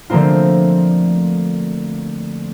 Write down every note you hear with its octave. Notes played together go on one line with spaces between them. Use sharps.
D3 F3 A3 A#3 C4 F4